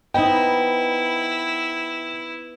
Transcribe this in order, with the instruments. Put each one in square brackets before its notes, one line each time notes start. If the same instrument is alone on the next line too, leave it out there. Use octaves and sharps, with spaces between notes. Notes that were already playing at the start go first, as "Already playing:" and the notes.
[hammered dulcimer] B3 [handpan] D#4 C5 D#5 [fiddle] E4 [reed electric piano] G5